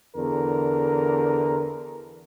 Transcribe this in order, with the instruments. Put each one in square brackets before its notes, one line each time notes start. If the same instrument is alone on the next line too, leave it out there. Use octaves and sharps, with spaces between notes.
[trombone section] E2 D3 A#4